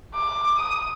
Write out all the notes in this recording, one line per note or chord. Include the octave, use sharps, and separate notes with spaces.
D6
D#6